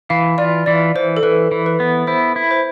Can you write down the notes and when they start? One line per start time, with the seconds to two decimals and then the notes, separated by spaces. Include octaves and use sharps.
0.10 E3 F5
0.38 F4 D5
0.66 E3 D5
0.95 E3 C5
1.17 A4
1.23 E3 B4
1.51 E3
1.66 B4
1.80 B3
2.07 E4 C5
2.36 E4
2.51 C5